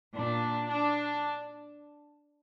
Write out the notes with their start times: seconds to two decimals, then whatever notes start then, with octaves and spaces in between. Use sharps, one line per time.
0.14 A#2 D4
0.69 D4